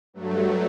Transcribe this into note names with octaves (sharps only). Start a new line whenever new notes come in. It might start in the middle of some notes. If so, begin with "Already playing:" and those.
G2 F#3 A3